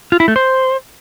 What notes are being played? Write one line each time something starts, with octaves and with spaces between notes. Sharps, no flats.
F4
E4
A3
C5